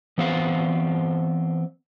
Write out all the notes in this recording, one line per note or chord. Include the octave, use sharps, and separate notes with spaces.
E3 B3 C4 C5 F5